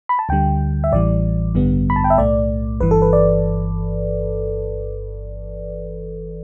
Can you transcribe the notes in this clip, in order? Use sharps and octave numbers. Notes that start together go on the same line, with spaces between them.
B5
A5
D2 D3 G3 G5
E5
A1 A2 E3 G3 D5
A1 G2 D3 G3 B3
B5
A5
G5
E5
B1 A2 A3 D5
G1 G2 E3 B4
A4
B4
D5